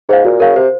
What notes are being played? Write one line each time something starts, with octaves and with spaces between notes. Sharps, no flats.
G#2 G#4 C5 F5
A#2 F#4
C#3 A#4 F5
C3 C5